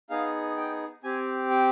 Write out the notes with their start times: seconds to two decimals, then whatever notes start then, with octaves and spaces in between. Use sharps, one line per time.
0.09 B3 D#4 G#4 F5
0.57 G5
1.04 C4 G4 G#5
1.50 G5